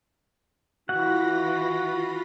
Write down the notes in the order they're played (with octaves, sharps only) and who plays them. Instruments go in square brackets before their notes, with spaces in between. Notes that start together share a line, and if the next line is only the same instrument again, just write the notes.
[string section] E3 [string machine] F4 B5 A#6 [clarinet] F#4 [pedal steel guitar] F#5